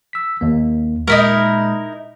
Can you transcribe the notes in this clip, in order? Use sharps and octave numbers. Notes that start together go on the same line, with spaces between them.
E6 B6
D#2 A#3
A#2 G#3 D#4 E4 A#4